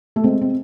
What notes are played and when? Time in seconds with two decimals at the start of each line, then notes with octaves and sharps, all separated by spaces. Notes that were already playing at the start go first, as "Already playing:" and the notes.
0.16 A3
0.24 G#3 C4
0.41 C4